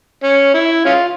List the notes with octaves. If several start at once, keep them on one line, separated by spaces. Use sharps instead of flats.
C#4
E4
C#4 F4